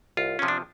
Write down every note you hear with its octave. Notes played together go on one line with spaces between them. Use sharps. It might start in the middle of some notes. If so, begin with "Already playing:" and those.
C2 F4
C3 F3 C#4
D4